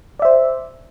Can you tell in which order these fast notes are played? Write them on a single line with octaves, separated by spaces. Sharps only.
D5 E5 C5